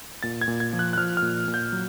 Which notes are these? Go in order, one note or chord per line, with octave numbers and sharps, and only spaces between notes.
A#2 A6
G#6
A#2
G#6
F3
F#6
F#6
F3 F6
F6
A#2
A#2
G6
F#3